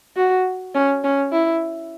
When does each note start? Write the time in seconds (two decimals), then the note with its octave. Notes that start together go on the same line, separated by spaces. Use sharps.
0.17 F#4
0.75 C#4
1.04 C#4
1.32 E4